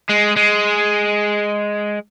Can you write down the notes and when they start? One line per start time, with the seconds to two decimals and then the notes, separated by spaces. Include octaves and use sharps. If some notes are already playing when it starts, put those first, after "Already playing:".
0.09 G#3
0.36 G#3